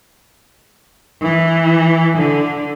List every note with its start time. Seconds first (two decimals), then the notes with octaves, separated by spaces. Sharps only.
1.21 E3
2.17 D3